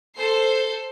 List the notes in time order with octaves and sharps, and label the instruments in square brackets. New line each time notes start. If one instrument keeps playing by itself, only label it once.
[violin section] A4 C5 C7